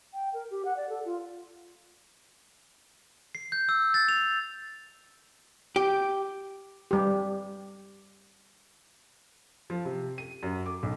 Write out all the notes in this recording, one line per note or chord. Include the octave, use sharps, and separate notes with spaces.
G5
A#4
G4
F#5
D5
A4
F4
C7
G6
E6
A6
F7
G4
G3 G4
F3
C3
D#7
F#2
D6
B1